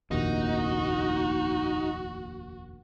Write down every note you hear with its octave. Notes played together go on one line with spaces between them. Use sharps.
F1 A#1 D#2 D#4 F#4